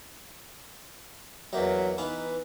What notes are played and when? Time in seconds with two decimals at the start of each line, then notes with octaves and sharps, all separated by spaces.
1.53 E2 F#3 A#3 D#4 E5
1.98 E3 B3 D#4 B4 F5